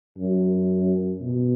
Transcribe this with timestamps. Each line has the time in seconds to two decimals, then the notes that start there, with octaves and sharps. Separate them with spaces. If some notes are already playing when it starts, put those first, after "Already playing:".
0.18 F#2
1.21 B2